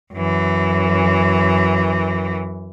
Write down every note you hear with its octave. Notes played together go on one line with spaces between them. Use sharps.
F#2 E3